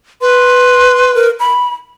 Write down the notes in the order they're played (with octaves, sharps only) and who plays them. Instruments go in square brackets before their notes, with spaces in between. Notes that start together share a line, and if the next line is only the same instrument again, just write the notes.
[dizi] B4 [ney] C6
[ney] A#4
B5